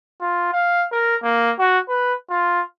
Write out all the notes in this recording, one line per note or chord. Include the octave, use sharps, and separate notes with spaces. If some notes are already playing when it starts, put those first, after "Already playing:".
F4
F5
A#4
A#3
F#4
B4
F4